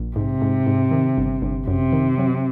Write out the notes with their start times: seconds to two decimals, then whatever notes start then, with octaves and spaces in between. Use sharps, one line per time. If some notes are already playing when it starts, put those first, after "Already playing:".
Already playing: A#1
0.16 G#2 C3
0.42 G#2
0.66 G#2
0.91 D#3
1.18 G1
1.42 G1
1.68 F#2 C3
1.93 D#3
2.18 F#3